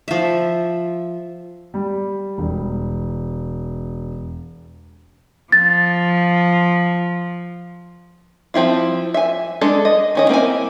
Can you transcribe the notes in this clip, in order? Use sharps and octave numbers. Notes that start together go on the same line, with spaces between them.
F3 E5
G3
E1
F3 A6
F3 C4 E4 F4
E5 G#5
G#3 D4 A4
D#5
D#3 C#4 D#5
A#3 C4 E4 G#5